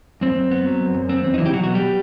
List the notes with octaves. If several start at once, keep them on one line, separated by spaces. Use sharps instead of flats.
F#2 C4
F#2
B3
F#3
F#2
F#2
B3 C4
E2 C4
D#4
E3 F#3 E4
G4
B2 F#3 F#4
B3 F#4
G3 G4